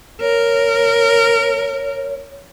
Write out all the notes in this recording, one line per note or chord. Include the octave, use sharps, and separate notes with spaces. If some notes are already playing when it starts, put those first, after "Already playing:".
A#4 C#5